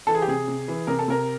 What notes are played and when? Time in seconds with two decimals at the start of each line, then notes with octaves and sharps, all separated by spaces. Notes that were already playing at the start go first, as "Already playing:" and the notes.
0.07 E3 A4
0.14 G#4
0.22 G4
0.28 C3 G#4
0.48 C3
0.68 E3
0.87 C3 A#4
0.99 A4
1.08 C3 A#4